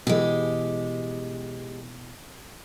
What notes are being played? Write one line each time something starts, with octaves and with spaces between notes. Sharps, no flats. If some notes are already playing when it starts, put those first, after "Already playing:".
B2 E3 G#3 G4